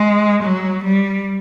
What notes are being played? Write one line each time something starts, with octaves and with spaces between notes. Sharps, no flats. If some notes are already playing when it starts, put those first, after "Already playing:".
Already playing: G#3
F#3
G3